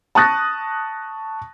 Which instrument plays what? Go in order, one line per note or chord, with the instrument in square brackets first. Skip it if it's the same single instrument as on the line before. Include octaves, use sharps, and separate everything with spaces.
[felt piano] A5 C#6 D#6 F#6 A6 A#6